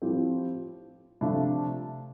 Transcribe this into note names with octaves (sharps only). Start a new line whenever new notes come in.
A2 F3 C4 G4
C3 F3 A3 D4 F4